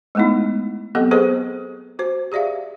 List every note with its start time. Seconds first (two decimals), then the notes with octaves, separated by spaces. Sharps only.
0.15 G#3 A3 B3 D#4 E4
0.95 F#3 B3 C4 G4 A4 D#5
1.11 G#4 A4 B4 C5 D#5
1.99 F#4 C5
2.32 G4 G#4 D5 E5 F5